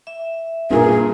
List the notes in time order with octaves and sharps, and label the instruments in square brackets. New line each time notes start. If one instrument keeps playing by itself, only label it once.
[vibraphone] E5
[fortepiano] G2 A#2 [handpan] F4 A#4 [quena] G#4